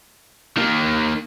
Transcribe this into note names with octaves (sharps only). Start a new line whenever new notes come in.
D#3 A#3